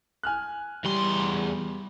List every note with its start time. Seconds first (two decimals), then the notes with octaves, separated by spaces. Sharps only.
0.23 G#5 F6 F#6
0.85 E2 G3 C6